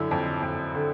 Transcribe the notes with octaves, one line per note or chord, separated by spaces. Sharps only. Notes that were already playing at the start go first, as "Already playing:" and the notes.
Already playing: F#2 D3 E4
F2
F2
D3